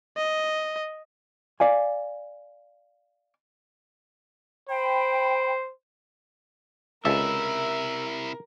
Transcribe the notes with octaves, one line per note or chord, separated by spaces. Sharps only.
D#5
D5 F5 G#5
C5 G5 B5
C#2 C3 E4 A4 A#4 E5